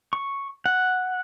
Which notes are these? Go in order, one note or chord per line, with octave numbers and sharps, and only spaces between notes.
C#6
F#5